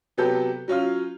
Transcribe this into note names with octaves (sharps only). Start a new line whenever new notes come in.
C3 F#3 B3 G4 A4 G6
F#3 C#4 F4 F6